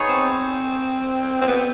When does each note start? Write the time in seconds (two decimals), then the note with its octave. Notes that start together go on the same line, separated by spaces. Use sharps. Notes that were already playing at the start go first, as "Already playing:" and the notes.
Already playing: B3 D#4 G#4 C#5
0.09 C4
1.41 C4
1.48 B3